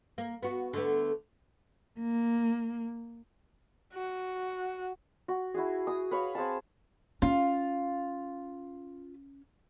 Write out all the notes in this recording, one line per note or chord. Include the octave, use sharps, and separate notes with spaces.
A#3
B3 F#4
D3 A3 B3
A#3
F#4
F#4
E4 F#4 G#4
D#6
B4 C#5 F5
C4 G#4 F5 A5
C#4 F4